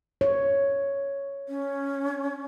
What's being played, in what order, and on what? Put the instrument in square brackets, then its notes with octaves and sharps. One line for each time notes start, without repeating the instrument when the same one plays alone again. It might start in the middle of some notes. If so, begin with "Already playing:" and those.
[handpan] C#5
[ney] C#4